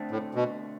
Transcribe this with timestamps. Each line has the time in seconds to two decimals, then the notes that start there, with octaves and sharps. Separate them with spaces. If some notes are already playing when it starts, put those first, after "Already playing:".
Already playing: D3 A3 C4
0.11 A2
0.35 B2